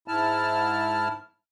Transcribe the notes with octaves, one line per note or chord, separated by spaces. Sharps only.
G#2 E4 A5 F6